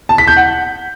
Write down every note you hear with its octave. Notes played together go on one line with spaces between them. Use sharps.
A5
B6
G6
F#5